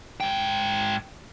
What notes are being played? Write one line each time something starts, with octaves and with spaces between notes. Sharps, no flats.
G#2 G5